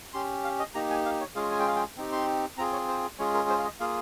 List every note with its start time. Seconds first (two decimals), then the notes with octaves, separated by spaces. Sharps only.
0.13 C#4 G4 C6
0.44 F5
0.59 D#5
0.75 A#3 D#4 G4 A#5
0.90 G#5
1.05 F5
1.20 C#5
1.35 G#3 C#4 F4 G#4 F5
1.51 G#5
1.59 G5
1.68 F5
1.76 G5
1.97 C4 D#4 G4
2.12 C6
2.57 C4 F4 G#4 A#5
2.73 C#5
2.88 C5
3.19 G#3 C#4 F4 G#4 C#5
3.34 A#4
3.49 C5
3.59 F5
3.64 D#5
3.80 A#3 F4 G#4 F5